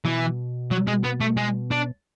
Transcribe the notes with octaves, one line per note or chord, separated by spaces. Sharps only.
B2 E3
F#3
G#3
B3
A3
G#3
D4